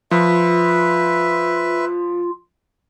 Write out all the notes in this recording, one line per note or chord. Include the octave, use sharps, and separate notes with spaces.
F3 F4 B4 E5